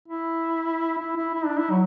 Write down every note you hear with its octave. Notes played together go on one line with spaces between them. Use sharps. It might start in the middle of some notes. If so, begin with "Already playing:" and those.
E4
E4
E4
E4
D4
E4
F#3